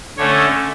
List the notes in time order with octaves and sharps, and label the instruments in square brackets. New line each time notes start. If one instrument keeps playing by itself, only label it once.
[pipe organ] D3 A3 C#4 C#5